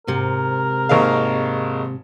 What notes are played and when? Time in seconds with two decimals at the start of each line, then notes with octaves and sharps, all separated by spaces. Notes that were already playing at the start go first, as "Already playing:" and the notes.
0.07 G#2 C3 A#4
0.89 G#1 A#3 G#4 D#5 F5 C#6